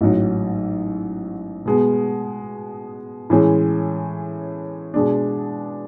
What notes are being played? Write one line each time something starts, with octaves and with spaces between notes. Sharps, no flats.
A1 G#2 F#3
B2 G#3 B3
A2 E3 G#3 C#4
B2 G#3 D4